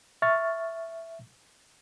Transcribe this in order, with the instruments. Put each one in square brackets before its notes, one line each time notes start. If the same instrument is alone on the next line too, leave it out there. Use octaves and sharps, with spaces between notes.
[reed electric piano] E5 C#6 F6 A6